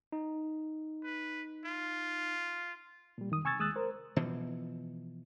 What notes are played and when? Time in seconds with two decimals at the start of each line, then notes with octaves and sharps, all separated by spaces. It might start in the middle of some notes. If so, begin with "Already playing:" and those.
0.12 D#4
1.04 B4
1.65 F4
3.18 A#2 G3
3.30 F2 D#3 D#6
3.44 C3 G#5 C#6 E6 G#6 A6
3.59 D#2 G#3 D#6 E6 F#6 A6
3.76 A#4 C5
4.16 B2 E3 F3